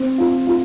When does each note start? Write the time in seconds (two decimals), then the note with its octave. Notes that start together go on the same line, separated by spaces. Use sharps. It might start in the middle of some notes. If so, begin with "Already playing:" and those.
Already playing: C4
0.18 F4
0.47 F4